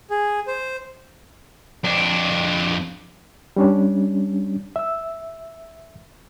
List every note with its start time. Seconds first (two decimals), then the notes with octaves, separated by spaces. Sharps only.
0.10 G#4
0.47 C5
1.84 F2 D4
3.56 G3 C#4 D4
4.76 E5 E6